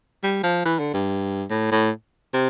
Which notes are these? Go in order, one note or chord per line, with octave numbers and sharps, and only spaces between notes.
G3
F3
E3
D3
G2
A2
A2
C3